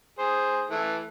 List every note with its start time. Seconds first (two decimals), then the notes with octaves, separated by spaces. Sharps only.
0.19 G#4 C5
0.70 E3 A3